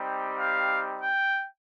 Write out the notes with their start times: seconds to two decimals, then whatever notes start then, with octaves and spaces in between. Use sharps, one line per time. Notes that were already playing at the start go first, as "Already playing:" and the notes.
Already playing: G3 C4 D#4 G4
0.38 F5
1.01 G5